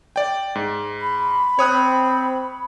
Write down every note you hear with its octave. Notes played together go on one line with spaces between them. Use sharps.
D5 G5
G#2
B5
C4 C#5 D#6 F#6